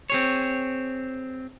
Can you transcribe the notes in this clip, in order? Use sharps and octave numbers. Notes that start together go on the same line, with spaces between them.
C4 G#4 C#5